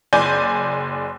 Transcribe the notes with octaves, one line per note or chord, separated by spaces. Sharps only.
F#1 D5 G#5 G6